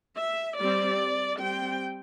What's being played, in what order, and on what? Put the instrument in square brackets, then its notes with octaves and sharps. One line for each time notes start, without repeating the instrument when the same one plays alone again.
[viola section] E5
G3 C4 D5
G3 C4 G5